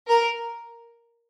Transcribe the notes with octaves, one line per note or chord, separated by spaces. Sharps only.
A#4